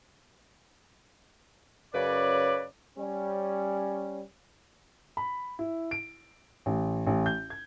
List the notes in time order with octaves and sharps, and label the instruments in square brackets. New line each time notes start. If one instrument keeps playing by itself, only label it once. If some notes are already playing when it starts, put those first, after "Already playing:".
[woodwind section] F#2 C#3 B4 C#5 D5
[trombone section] G3 C#4
[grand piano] B5
E4
D7
A1
A1
G6
G#6